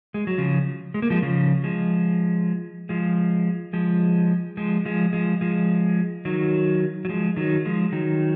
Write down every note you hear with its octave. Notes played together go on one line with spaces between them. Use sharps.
G#3
F#3
C#3 F3
G#3
A#3
F3 G#3
C#3 F3
F3 G#3
F3 G#3
F3 G#3
F3 G#3
F3 G#3
F3 G#3
F3 G#3
D#3 F#3
F#3
F3 G#3
D#3 F#3
F3 G#3
D#3 F#3